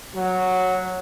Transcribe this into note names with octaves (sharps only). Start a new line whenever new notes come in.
F#3